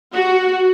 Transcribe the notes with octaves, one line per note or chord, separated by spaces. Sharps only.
F#4